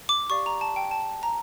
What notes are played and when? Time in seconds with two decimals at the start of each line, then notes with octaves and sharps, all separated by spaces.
0.09 D6
0.30 G4 D5 F5 C#6
0.46 A#5
0.61 A5
0.76 G5
0.91 A5
1.23 A#5